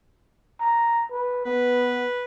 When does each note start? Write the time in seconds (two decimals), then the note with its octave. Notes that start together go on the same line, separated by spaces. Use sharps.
0.60 A#5
1.11 B4
1.45 B3 B4